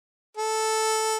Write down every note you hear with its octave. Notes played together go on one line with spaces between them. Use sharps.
A4